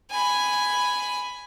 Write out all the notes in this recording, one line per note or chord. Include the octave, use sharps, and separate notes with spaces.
G#5 B5